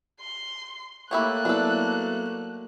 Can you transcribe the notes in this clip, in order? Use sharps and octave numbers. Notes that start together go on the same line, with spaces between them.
C6
A3 A#3 E4 G4 C#5 F#6
F#3 B3 D4 E4 A4